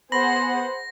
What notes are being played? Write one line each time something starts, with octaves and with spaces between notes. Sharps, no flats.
B3 G#4 C5 F#5 B5 C6 A#6